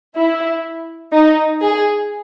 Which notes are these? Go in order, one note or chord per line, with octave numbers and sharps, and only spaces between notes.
E4
D#4
G#4